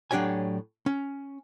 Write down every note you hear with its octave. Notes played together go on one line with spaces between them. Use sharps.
A2 F#3 D4 G4 C#5 G#5
C#4